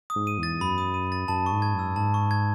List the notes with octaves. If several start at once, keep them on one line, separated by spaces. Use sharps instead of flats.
D#6
G#2
D#7
E2 A6
F#2 B5
D#6
D#7
A6
F#2 A5
C#6
G#2
G#6
F#2 E6
G#2 A5
C#6
G#6